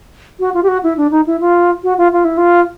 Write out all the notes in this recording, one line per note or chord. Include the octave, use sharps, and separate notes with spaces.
F#4
F4
G4
F#4
E4
D4
D#4
E4
F4
F#4
F4
F4
E4
F4